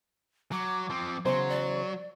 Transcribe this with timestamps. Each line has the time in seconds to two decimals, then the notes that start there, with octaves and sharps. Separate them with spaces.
0.52 F#3 D6
0.90 F3 C4
1.25 E2 C#3 F#3 C5 C6
1.49 D5